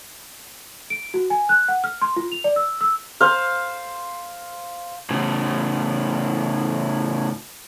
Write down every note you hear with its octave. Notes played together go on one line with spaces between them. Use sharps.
D7
F#4
G#5
F#6
F#5
F6
C6
F4
F7
D5
E6
E6
C5 F5
A2 C#3